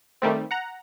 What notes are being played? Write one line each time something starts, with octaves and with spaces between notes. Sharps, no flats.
D#3 G3 A3 C4
F#5 A#5